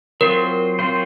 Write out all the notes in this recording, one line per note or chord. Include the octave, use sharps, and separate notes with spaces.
F#3 C4 F4 A#4 C5
F#3 C4 F4 C5